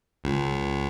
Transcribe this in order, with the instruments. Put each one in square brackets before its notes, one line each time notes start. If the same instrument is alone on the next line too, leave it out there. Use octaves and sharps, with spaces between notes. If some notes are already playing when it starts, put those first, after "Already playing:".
[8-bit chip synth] C#2